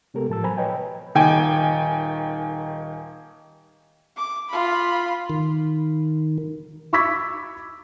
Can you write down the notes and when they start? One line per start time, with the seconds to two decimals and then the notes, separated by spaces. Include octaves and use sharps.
0.14 C3 G#3 B3 G4 A4 A#4
0.29 A2 F3 A5 E6
0.43 F#3 C5 G#5 A#5 B5
0.57 B4 C#5 D#5 G5 G#5
1.15 D#1 D#3 G5 G#5
4.17 D6
4.49 F4 B5
5.30 D#3
6.93 B5 C#6 D6 E6 G#6 B6